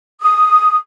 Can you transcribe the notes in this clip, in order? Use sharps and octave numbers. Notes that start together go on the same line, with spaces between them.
D#6